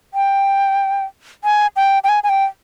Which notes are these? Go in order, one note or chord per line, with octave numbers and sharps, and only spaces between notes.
G5
G#5
G5
G5
G#5
G#5
G5